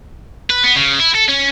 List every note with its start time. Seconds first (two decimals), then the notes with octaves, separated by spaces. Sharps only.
0.50 B4
0.64 B3
0.76 C#3
1.00 E4
1.15 A4
1.29 C#4